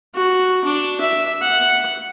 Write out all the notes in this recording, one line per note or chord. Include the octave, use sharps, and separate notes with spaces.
F#4
D4
E5
F#5